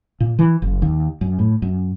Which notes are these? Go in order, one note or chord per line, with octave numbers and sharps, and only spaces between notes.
A#2
E3
F#1
D#2
F#2
A2
F#2